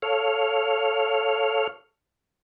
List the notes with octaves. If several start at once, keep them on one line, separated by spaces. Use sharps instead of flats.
A4 C#5 F5